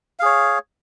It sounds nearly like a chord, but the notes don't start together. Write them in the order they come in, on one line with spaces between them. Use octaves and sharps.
F5 G#4 C#5